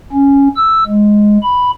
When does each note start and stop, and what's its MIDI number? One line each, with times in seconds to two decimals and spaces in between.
0.12 0.48 61
0.56 0.83 88
0.87 1.37 56
1.43 1.71 83